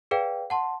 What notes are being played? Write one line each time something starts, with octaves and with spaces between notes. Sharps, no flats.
G#4 B4 D5 F5 G5
F#5 A5 C6